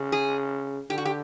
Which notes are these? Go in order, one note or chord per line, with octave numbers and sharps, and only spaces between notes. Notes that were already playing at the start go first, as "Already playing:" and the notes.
Already playing: C#3
G#4
D3 G4
F#4
G4